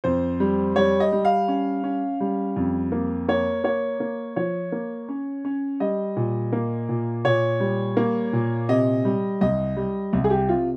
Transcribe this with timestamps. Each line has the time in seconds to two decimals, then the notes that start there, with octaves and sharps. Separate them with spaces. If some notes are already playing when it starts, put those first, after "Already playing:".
0.04 F2 C5
0.40 G3
0.76 G3 C#5
1.00 D#5
1.12 G3
1.25 F5
1.48 C#4
1.84 C#4
2.20 G3
2.56 F2
2.92 A#3
3.28 A#3 C#5
3.64 A#3 C#5
4.00 A#3
4.36 F3 C#5
4.72 A#3
5.09 C#4
5.45 C#4
5.80 G3 D#5
6.16 A#2
6.52 A#3
6.89 A#2
7.25 A#2 C#5
7.60 G3
7.97 A#3
8.33 A#2
8.69 C3 D#5
9.05 G3
9.41 C2 D#5
9.77 G3
10.13 C2
10.24 G#4
10.30 G4
10.48 C3 F4